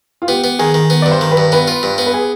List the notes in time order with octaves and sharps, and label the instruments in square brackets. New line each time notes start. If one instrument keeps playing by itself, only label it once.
[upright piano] F4
[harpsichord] B3 [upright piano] G4
[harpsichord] B3
[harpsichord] D#3 [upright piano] G#4
[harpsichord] D#3
B3
[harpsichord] G2 [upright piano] D5
[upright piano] C5
[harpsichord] D#3
[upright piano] B4
[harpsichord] G2
[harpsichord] B3 [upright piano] B4
[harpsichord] F4
G2
B3
[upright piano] B4
G#4